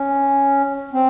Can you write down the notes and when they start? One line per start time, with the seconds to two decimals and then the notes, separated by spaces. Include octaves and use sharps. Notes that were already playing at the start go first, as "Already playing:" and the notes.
Already playing: C#4
0.93 C4